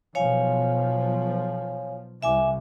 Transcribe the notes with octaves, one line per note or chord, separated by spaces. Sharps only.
B1 F3 C#5 F5 G#5
C2 E5 G#5 D6